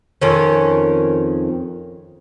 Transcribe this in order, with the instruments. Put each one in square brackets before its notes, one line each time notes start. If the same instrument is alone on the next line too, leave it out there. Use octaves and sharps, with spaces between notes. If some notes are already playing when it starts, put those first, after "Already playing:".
[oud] F2 D#3 C#4